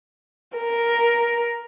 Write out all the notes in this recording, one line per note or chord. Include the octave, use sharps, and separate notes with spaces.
A#4